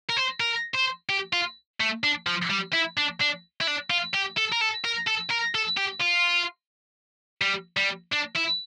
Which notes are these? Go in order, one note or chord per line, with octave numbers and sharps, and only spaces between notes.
A#4
C5
A#4
C5
G4
F4
A3
D4
F3
G3
E4
D4
D4
E4
D4
F4
G4
A4
A#4
A4
A#4
A4
A#4
A4
G4
F4
G3
G3
D4
E4